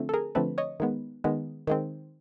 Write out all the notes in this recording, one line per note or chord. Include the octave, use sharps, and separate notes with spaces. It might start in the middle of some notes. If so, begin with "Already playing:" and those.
Already playing: D3 F3 A3 C4
A4
G#4 A#4
D3 F3 A3 C4 A4 B4
C#5 D#5
D#3 G#3 B3
D#3 G#3 B3
D#3 G#3 C4